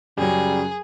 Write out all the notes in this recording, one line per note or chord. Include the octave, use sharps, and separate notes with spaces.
F#2 C#3 F#3 G3 G#4